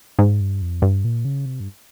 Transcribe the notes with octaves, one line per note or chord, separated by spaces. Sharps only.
G#2
G2
F2
G2
A#2
C#3
C3
G2